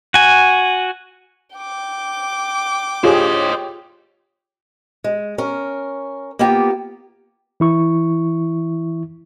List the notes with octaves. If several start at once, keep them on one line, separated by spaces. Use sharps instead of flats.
F#4 G#5
G5 D6
F4 G4 G#4 C5 C#5 D#5
G#3
C#4 A#4
A#3 B3 F4 G4
E3 E4 C#6